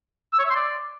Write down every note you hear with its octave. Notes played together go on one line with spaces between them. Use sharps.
E6
C#5
E5
C6
D5